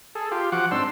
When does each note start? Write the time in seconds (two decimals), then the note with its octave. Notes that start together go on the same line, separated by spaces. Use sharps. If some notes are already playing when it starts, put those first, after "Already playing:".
0.15 G#4 A4
0.32 F4 G4
0.52 F3 F#4 F#5 D6
0.71 G#2 C4 D4 C6 E6